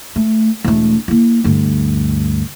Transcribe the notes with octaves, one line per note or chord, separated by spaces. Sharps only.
A3
E1 A3
A#3 E4
D2 G2